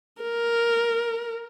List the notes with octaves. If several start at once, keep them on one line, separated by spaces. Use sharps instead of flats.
A#4